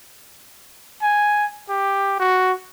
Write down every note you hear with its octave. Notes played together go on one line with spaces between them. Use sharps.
G#5
G4
F#4